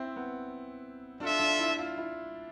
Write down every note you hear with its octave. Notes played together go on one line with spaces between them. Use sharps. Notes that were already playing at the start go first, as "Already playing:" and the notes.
Already playing: C4 E4
B3
D4 F4 A4 E5
D4
E4
F4
E4